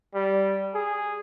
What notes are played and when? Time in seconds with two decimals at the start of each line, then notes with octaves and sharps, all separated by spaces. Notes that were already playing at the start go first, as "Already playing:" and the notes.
0.14 G3
0.75 G#4